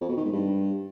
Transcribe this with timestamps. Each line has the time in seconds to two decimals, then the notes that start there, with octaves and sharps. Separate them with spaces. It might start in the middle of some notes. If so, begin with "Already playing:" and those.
0.01 F2
0.09 B2
0.17 D#3
0.25 G#2
0.33 G2